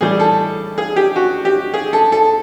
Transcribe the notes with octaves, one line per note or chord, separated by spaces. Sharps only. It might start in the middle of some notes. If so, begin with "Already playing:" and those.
A2 E3 G3 G#4
A4
G#4
G4
F#4
G4
G#4
A4
A4